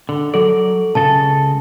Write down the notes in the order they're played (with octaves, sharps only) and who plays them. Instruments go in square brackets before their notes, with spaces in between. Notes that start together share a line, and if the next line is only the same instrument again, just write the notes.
[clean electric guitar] D3
[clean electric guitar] F#3 D5 [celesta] A4
[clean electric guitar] C#2 C#3 A4 [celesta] A5